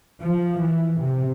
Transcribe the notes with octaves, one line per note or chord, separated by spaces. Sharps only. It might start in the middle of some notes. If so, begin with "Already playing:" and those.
F3
E3
C3